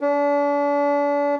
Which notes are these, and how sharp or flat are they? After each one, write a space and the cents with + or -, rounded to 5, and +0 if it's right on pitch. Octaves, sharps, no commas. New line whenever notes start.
D4 -40